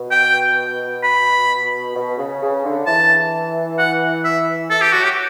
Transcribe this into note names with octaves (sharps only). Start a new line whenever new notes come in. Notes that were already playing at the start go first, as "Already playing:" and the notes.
Already playing: B2
G5
B5
B2
C#3
C#3
D3
E3 A5
F#5
E5
E3 A4
G4
F#3 F#4
G4